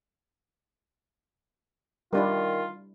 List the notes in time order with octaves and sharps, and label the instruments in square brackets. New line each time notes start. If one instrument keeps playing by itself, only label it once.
[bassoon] D#3 [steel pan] G3 D4 E4 [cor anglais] F4